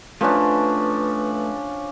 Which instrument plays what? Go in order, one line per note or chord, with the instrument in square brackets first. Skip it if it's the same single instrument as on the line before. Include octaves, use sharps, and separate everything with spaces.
[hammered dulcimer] F3 C#4 D4 [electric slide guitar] A3 B4